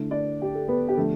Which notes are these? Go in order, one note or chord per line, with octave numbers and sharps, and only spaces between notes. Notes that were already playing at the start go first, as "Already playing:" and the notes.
Already playing: D3 A3 E4
D4 D5
G4
A4
B3 B4
G4
D3 F3 A3 D4 A4